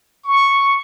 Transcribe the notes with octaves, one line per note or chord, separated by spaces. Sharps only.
C#6